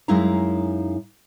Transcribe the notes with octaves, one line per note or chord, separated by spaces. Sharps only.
F#2 G#3 D#4 E4 F5 A#5